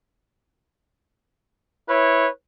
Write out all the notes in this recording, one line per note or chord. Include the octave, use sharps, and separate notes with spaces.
E4 B4 C#5